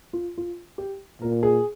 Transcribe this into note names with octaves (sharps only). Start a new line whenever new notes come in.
F4
F4
G4
A#2 A#4
G#4